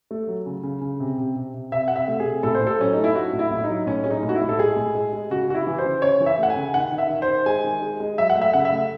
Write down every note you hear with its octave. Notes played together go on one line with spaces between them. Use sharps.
A3
F#3
C#3
C#3
C#3
C3
C3
C3
C3
C3 E5
C3 F#5
E5
A3
G#4
C3
A2 A4
C5
A2
A4
F#3 C#4
A3 D#4
E4
F#3 F#4
A2
E4
A2 E4
D#4
F#3
A2 C#4
G#3 C#4
D#4
A2
F#4
E4
A2
A4
G#3 G#4
A2
G#3
G#3
C#3 F#4
C#3 F#4
E4
E3
C5
C#3
C#3 C#5
E3
E5
A3 F#5
G#5
C#3
D#3 F#5
D#3
E5
D#3
C5
D#3
G#3 G#5
D#3
G#3
G#3
F#3 E5
F#5
A3
E5
C#3 F#5
E5
A3